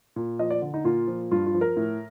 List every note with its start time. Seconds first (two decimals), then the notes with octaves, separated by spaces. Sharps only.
0.16 A#2
0.39 F3 D#5
0.50 D5
0.62 D3
0.74 D#4
0.84 A#2 F4
1.08 F3
1.31 G2 F4
1.46 F4
1.54 F3
1.61 A#4
1.77 A2